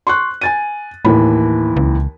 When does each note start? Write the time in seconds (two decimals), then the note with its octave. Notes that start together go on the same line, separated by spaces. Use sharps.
0.07 C6 C#6 F#6
0.41 G#5 A6 D#7
1.05 D#2 A2 E3 B5
1.76 C#2